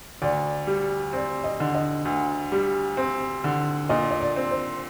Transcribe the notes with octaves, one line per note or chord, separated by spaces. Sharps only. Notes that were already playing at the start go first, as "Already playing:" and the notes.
D2 D5
G3
C4 D5
D#5
D3
D#5
D2
G3
C4
D3
A#2 D#5
D#5
D5
C4
C5